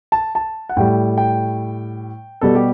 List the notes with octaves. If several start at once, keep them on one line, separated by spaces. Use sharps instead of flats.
A5
A5
F#5
A2 G3 G5
G5
B2 G3 A4
G4